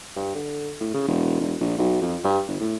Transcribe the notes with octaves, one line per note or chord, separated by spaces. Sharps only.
G2
D3
A2
C#3
E1
E1
A#1
B1
F2
G2
G1
A2